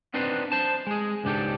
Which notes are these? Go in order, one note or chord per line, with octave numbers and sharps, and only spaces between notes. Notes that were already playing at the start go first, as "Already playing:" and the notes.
B3 C4 D4 D#4 B4 C5
C5 A5
G#3 G#4
C#2 G#2 D4 G4 A4